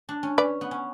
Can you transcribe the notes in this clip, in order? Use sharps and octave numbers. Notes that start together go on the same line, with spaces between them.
D4
C#4
C#4 B4 D5
B3
C#4